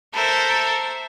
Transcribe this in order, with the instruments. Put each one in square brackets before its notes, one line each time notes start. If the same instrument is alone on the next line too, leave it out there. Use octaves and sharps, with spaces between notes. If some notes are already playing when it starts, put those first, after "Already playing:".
[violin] A4 A#4 [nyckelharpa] C5 E5